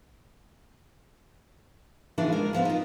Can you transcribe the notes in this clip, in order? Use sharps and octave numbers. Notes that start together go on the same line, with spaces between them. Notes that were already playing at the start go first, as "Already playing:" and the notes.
C#3 E3 F3 B3 D4 D#4
D2 G#3 A#4
G#2 F3 B3 C4
D#4 F4